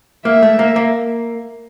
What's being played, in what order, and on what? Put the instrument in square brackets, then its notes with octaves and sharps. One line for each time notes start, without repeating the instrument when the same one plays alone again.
[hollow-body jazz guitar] A#3 [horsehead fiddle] E5
[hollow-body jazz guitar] A3
A#3
A#3